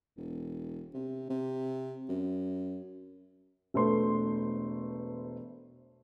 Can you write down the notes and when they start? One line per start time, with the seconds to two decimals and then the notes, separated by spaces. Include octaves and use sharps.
0.17 E1
0.94 C3
1.30 C3
2.09 F#2
3.74 E1 A3 B4 C5 C6